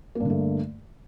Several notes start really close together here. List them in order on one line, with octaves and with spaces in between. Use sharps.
A#3 G2 D3 A3